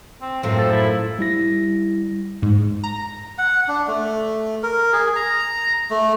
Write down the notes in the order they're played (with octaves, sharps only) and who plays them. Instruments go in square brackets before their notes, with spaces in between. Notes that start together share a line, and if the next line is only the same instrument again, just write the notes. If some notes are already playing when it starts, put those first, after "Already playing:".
[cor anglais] C4
[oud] F#2 A2 F3 [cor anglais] C4
[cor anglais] A4
E4
[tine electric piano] G3 E4 A#6
[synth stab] G#2
A#5
[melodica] F#5
D4
A3
A#4
G#4
A#5
A3